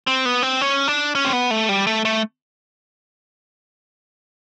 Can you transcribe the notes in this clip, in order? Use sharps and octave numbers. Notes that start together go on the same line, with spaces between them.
C4
B3
C4
C#4
D4
C#4
C4
B3
A3
G3
A3
A3